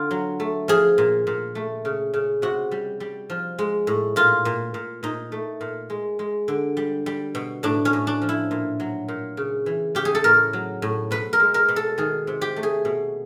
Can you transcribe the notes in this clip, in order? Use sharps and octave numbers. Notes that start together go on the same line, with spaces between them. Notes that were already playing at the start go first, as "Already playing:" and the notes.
Already playing: D3 F4
F#3
A3
F3 G#4
A#2
A#2
A3
C#3
C#3
C3 F#4
G3
G3
F3
G#3
A2
A#2 F4
A#2
A#2
A#2 D#4
A3
A#2
G#3
G#3
D3
G3
G3
B2
A2 D4
C#4
A2
D4
F3
E4
A#2
F#3
A#2
C#3
E3
C#3 G4
G#4
A4
A2 A#4
F#3
A2
B2 B4
A#4
G#3
A#4
B2
A4
D#3 G#4
C3
G4
A3
G#4
B2